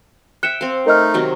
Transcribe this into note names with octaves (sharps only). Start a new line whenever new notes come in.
E5 G5 F#6 C#7 E7
C4 F5
A3 D#4 A#4 D#5 F6
C3 D#3 F#3